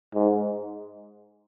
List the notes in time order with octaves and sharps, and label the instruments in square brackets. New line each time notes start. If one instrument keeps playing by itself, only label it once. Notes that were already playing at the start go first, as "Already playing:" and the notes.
[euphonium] G#2